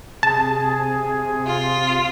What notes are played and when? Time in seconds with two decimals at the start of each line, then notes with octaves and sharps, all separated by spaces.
0.23 C3 G#4 A5
1.46 F4